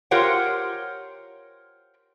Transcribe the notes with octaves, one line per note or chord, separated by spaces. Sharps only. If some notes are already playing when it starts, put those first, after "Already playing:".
F4 G4 A#4 C5 C#5 F#5